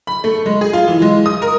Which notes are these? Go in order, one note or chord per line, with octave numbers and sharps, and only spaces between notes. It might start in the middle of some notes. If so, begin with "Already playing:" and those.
B5
A3
G#3
G#4
F4
E3
G#3
D#6
A#4